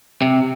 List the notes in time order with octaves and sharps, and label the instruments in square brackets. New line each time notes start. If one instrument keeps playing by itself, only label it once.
[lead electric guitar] C3